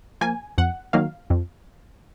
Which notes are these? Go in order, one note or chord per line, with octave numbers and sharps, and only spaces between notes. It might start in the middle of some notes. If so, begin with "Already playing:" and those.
F3 A#3 G#5
F2 F#5
D#3 F#3 A#3 F5
F2